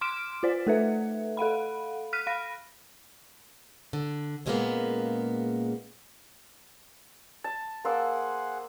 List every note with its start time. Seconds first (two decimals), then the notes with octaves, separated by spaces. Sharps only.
0.01 C6 D6 F6 D7 E7
0.43 F4 C5 D5
0.67 A3 A4 B4 E5
1.37 A4 F5 F#5 B5
2.13 F6 F#6 B6 D#7
2.27 F5 B5 A#6
3.93 D3
4.46 A#2 C#3 G3 G#3 A#3 B3
7.44 A5
7.85 A#3 G#4 C5 F#5 E6